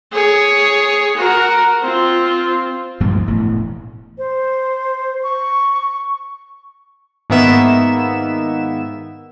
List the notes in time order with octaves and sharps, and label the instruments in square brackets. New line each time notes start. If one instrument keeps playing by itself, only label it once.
[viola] G#4 C#5
F#4 A#4
C4 F4
[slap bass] A1 G2 F3 A#3
E1 A2
[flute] C5
C#6
[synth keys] G#2 D#3 A#3 B3 E5 E7